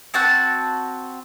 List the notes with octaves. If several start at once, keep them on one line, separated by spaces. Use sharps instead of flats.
C4 F#4 A5 F#6